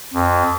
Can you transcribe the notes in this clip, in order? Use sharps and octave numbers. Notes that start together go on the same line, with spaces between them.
F2